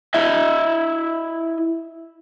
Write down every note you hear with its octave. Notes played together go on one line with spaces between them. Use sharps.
E4 D#5 E5